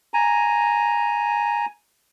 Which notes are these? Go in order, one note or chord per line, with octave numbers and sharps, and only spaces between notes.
G#5 A#5